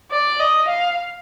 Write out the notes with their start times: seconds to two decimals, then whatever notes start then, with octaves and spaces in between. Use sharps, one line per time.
0.11 D5
0.39 D#5
0.68 F5